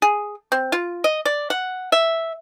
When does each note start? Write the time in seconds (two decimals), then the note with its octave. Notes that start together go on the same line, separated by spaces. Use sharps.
0.02 G#4
0.52 C4
0.72 F4
1.04 D#5
1.25 D5
1.50 F#5
1.92 E5